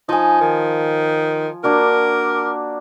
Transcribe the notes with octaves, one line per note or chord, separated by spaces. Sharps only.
F3 D#4 G#5
D#3
A#3 D4 F#4 A#4